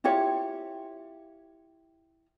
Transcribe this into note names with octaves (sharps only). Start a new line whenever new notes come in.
E4 F4 G4 C#5